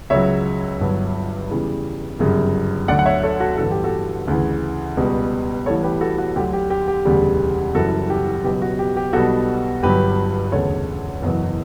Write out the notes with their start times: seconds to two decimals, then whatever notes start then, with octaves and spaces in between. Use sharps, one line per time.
0.10 C#2 C#3 F#3 C#5 E5
0.80 G1 G2 F#3
1.50 E2 C#3 E3 G3
2.19 G1 F#2 C#3 G3
2.88 D2 D5 F#5
2.91 D3 F#3
2.99 F#5
3.06 C#5 E5
3.23 A4 C#5
3.40 F#4 A4
3.57 A1 G2 D3 A4
3.71 G4
3.84 F#4 A4
4.28 D2 C#3 E3
4.97 C#2 B2 G3
5.66 A1 A2 G3 A4 C#5
5.83 G4 B4
6.01 F#4 A4
6.18 F#4
6.36 D2 D3 F#3 G4
6.53 G4
6.70 G4
6.88 G4
7.05 E1 D2 C#3 G3
7.75 F#1 F#2 E3 G3 F#4 A4
8.10 G4
8.44 C#2 B2 F#3 G4
8.62 F#4
8.79 G4
8.97 G4
9.13 B1 B2 G3 F#4 A4
9.83 G1 G2 F#3 G4 B4
10.52 E1 D2 C#3 A4 C#5
11.22 F#1 E2 B2 F#3